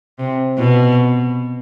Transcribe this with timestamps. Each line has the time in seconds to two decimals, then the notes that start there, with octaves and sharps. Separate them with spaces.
0.19 C3
0.59 B2